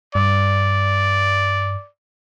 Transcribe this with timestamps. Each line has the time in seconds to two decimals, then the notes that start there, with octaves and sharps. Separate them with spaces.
0.15 G2 D5